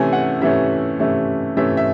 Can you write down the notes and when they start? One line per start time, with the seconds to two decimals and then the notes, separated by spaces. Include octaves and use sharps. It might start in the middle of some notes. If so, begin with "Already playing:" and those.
Already playing: C3 E3 A3 C#4 G#5
0.13 F#5
0.41 C3 E3 A3 C#4 E5
0.99 C3 E3 A3 C#4
1.57 C3 E3 A3 C#4 E5
1.77 E5